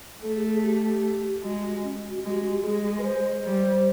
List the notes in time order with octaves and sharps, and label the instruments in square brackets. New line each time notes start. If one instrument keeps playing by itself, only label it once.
[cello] A3 [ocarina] A4
[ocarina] G#4
G#4
G4
[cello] G#3 [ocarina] F#4
[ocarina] C#4
F#4
[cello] G#3 [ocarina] F#4
[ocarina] G4
F#4
G4
[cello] G#3 [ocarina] G#4
[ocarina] B4
C5
[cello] G3